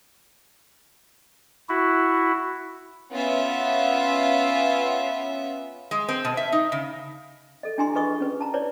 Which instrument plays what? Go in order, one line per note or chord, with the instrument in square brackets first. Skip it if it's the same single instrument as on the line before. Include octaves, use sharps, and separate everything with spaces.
[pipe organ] E4 F#4
[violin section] B3 C#4 F4 E5
[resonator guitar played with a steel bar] G#3
C4
B2
E5
D#4
C#3
[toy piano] A4 D#5
D4 E4 G4 G#5 A#5 C6
F4 G#4 B4 D#5 C#6 D#6
C#4 B4
A5 A#5
E4 B4 C#5 D5